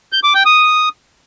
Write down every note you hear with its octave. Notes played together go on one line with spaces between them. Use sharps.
G6
D6
G5
D#6